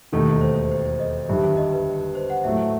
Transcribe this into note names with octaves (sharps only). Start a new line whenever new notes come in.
E1 D#2 D#3 A3 D#4 A4
C5
C5
D#5
G1 G2 D#3 G3 E5
D#5
B4
C5
F#5
A2 F#3 A3 E5